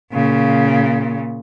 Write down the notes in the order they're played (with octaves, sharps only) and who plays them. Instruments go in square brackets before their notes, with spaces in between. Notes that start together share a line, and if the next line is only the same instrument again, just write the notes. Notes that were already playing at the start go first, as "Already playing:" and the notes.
[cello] A#2 C#3